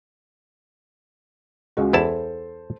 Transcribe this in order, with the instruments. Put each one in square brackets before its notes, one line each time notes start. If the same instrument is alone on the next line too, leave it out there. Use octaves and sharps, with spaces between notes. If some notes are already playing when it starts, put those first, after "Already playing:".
[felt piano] C#2 G#3 F#4
[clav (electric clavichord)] E2 E4 A5 [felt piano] A4 C5